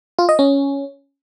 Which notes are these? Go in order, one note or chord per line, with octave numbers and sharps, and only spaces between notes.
F4
D#5
C#4